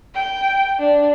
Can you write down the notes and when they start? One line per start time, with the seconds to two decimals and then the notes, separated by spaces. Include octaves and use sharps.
0.15 G5
0.79 D4